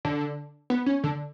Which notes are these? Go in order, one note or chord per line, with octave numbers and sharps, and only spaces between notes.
D3
B3
C#4
D3